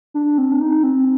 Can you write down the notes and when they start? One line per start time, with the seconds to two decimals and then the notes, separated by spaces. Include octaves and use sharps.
0.14 D4
0.38 C4
0.52 D4
0.61 D#4
0.83 C4